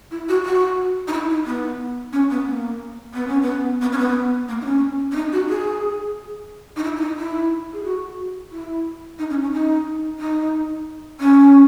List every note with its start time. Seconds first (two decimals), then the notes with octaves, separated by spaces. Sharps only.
0.11 E4
0.29 F#4
0.45 F#4
1.08 D#4
1.13 E4
1.29 D#4
1.46 B3
2.13 C#4
2.30 B3
2.46 A#3
3.14 B3
3.28 C#4
3.42 B3
3.81 B3
3.92 C#4
3.98 B3
4.48 A#3
4.61 D#4
4.65 C#4
5.12 C#4
5.16 D#4
5.32 F#4
5.49 G#4
6.77 D#4
6.83 E4
6.96 E4
7.01 D#4
7.17 E4
7.73 G#4
7.84 F#4
8.51 E4
9.19 D#4
9.30 C#4
9.42 C#4
9.53 D#4
10.20 D#4
11.21 C#4